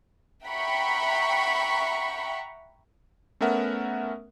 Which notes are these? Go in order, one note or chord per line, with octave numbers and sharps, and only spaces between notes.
E5 F#5 G5 A#5 B5 C#6
A3 B3 C#4 A#4 E5 F#5